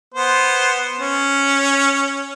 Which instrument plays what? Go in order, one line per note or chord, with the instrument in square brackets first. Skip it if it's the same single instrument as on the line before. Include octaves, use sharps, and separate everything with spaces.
[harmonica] B3 C5
C#4